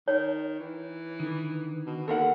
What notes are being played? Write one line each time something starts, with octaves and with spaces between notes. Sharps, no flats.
D#3 C#5
E3
D3 D#3
B2
D#2 A4 A#4 F#5